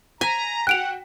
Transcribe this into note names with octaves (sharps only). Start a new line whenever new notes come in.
G#5 A#5 B6
F#4 F#5 G5 F#6 D7 F7